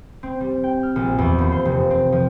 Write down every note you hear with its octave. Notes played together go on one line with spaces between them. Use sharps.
C4
G3
G5
F6
A#1
E2
D#2
C5
F1
C4
F3